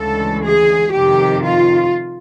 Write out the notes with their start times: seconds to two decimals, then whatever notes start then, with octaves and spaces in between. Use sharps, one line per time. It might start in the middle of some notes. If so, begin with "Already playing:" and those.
Already playing: D2 C#3 E3 G#3 A4
0.43 G#4
0.93 F2 C3 D#3 G4
1.44 F4